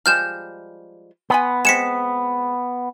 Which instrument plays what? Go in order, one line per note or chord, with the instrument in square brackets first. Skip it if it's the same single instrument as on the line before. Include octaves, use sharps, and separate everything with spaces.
[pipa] F3 G3 G#3 [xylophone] F6 G6 E7
[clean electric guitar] B3 [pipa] G#5 B5 C6
[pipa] G#3 C4 [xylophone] B6 C#7 E7